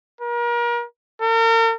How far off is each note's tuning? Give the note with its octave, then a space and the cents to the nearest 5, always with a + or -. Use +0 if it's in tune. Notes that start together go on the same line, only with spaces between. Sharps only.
A#4 +35
A#4 -40